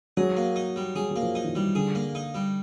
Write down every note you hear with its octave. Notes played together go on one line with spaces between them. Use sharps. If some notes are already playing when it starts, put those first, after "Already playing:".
F#3 G#4
A#3
D#4
G3
F#3 G#4
F#3 A#3
F3
D#4
E3
D#3
G3
D3 G#4
A#3
D#4
G3